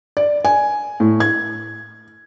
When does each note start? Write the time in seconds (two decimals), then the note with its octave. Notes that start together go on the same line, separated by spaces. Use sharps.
0.17 D5
0.45 G#5
1.00 A2
1.20 G#6